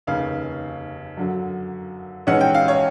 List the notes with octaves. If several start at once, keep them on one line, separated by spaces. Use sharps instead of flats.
F1 D#2 C#3 F5
F#2 D3 F#3
A#1 G#2 E3 G#3 C#4 F#5
G5
F5
C#5